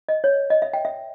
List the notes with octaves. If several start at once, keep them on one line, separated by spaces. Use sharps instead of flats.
D#5
C#5
D#5
E5
G5
E5